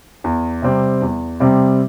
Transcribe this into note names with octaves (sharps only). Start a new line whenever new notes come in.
E2
C3 G3 C4
E2
C3 G3 C4